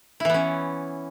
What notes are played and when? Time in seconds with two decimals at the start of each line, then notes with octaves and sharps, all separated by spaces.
0.20 E4
0.25 E3
0.30 B3
0.34 C#4